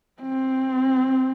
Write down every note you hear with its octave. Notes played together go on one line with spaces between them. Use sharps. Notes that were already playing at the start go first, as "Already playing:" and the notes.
C4